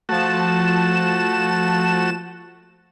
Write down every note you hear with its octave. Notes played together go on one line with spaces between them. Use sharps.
F3 A3 F#4 A5 E7